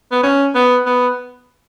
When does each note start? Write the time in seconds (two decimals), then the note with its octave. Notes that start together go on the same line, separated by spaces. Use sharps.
0.12 B3
0.23 C#4
0.55 B3
0.86 B3